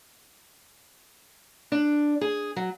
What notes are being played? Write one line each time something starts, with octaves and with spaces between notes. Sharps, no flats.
D4
G#4
F#3